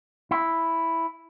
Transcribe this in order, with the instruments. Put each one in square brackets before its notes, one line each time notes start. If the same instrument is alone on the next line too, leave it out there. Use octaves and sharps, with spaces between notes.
[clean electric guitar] E4